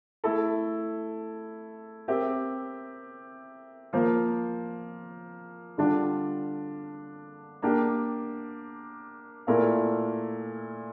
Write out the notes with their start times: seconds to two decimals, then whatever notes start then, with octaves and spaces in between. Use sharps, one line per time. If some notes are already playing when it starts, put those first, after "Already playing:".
0.24 A3 E4 A4
2.08 C4 G4 A#4 E5
3.93 F3 A#3 F4 C5
5.78 D3 G3 D4 F4
7.62 A#3 D4 G4
9.47 A#2 A3 E4 A#4 F5